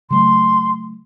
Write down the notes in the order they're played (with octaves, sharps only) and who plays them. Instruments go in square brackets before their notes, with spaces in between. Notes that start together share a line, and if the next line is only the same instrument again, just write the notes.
[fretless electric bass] C#3 F#3 A3 [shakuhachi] C6